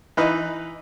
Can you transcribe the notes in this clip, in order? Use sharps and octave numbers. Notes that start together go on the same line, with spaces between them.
E3 D#4 B4